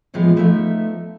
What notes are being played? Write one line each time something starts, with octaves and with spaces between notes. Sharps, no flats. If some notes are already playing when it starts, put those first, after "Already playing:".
D#2 A2 E3 F3 G#3 B3
F3 A3 B3 D#4 D#5 E5